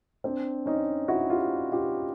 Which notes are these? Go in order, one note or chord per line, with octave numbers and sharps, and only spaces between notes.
C4 D4
C#4 D#4
E4 F#4
F4 G4
F4 G4